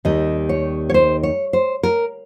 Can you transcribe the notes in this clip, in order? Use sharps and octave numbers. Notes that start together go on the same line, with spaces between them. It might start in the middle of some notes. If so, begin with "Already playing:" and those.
D#2 D#3 G3 D#5
C#5
C#5
C5
C#5
C5
A#4